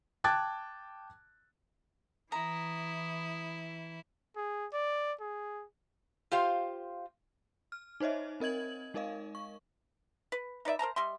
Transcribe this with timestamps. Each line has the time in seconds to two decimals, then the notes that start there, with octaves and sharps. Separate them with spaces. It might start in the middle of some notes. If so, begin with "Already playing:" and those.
0.24 G5 A5 D6 F#6 G#6 A6
2.32 E3 E4 A#5 D#6
4.36 G#4
4.73 D5
5.20 G#4
6.31 F4 G4 C5 F5
7.72 F6
8.00 D#4 C5 C#5 D#5 E5
8.40 C4 A#4 D#5 G#6 F#7
8.94 G#3 D#4 A#4 D#5 F5
9.35 C#6
10.32 B4
10.65 D#4 B4 D5 E5
10.79 A#4 C5 A5 A#5
10.96 G3 D#5 E5 C6